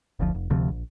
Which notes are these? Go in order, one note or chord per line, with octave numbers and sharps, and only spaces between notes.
F#1 D2 F3
F1
D1 D2 C3 F3
A#1